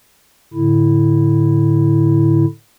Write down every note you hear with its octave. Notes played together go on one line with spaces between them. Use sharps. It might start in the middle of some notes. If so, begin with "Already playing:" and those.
A2 D3 E4